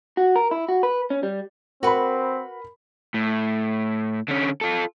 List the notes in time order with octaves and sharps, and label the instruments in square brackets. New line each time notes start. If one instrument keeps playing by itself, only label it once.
[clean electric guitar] F#4
A#4
E4
F#4
B4
C#4
G3
[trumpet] C4 [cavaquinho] F#4 B4 [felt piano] A#4 B5
[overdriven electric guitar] A2
D3 C#4
F4 A4